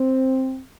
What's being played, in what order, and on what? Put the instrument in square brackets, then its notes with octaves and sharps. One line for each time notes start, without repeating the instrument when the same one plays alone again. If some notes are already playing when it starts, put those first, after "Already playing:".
Already playing: [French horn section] C4